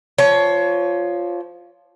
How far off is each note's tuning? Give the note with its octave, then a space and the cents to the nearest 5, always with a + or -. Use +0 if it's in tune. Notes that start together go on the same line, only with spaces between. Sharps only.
F3 +0 C#5 +20